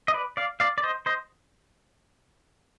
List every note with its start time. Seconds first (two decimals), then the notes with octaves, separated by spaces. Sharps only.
0.08 D#5
0.14 B4 D5
0.37 D5 F5
0.60 D5 F5
0.78 D5
0.83 C5 D#5
1.06 C5 D#5